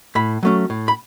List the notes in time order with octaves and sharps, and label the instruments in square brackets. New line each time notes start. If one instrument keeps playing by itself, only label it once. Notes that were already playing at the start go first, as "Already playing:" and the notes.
[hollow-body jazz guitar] A2 B5
F#3 A3 C#4
A2
B5